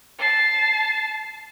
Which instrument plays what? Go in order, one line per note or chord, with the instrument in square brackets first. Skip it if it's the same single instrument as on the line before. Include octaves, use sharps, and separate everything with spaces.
[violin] A5 C7